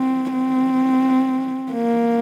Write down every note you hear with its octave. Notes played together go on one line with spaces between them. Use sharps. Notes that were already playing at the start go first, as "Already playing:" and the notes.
Already playing: C4
C4
A#3